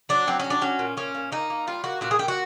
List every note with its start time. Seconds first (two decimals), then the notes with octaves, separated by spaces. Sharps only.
0.09 F#3 D4
0.27 F#3 C4
0.39 F#3 C#4
0.50 D4
0.62 F#3 C#4
0.79 A#2
0.97 A#2 C#4
1.15 A#2
1.32 A#3 D#4
1.50 A#3
1.67 G3 F4
1.84 A#3 F#4
2.01 A#2 F#4
2.11 G#4
2.19 A#2 G4
2.28 F#4